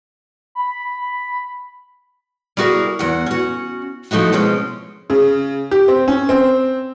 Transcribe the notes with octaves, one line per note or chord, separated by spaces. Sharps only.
B5
G3 E4 F#4 G#4 A#4
E2 F#5
C#4 F#4
F3 A3 D#4 E4 F#4
B2 F3 G#3 C4 C#4
C#3
G4
C4
C#4
C4